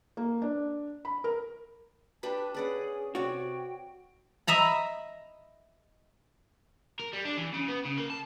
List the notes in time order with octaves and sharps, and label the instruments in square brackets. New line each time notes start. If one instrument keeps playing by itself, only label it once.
[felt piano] A#3
D4
B5
A#4
[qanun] D4 G4 B4 [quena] A5
[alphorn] C#4 [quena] G#4 [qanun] B4 D5 F#5
[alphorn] C3 [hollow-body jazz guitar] F#4 [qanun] C#5 D5 [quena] G5
[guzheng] D#5 E5 A#5 B5
[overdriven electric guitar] A#4
G3
D4
E3
C#3
B3
C#3
A#3
A5